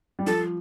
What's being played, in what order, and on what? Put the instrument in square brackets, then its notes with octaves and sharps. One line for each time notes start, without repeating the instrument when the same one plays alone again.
[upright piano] G3
[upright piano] F3 [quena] A4